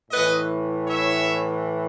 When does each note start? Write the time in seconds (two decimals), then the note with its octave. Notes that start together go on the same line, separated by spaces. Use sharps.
0.11 A2 E3 B4 D#5
0.87 C#5 E5